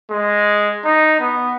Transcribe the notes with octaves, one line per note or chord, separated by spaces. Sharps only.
G#3
D#4
B3